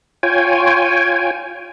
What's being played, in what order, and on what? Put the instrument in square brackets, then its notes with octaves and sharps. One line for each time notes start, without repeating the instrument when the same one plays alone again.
[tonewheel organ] F4 C#5 G5 G#5